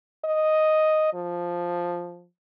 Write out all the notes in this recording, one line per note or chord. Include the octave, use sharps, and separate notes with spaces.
D#5
F3